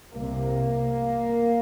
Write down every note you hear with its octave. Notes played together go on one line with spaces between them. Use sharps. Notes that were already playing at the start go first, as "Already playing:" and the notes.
C2 C3 A#3